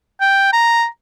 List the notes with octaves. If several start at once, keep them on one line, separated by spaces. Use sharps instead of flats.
G5
A#5